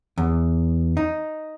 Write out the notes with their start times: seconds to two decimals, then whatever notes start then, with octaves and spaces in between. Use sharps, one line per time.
0.18 E2
0.97 D#4